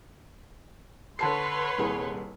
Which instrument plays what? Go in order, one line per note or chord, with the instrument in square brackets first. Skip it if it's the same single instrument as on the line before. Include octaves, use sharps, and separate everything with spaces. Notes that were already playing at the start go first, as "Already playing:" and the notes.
[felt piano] D3 A5 C7 [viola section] B4 C#5 C6
[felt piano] D#1 C2 G#4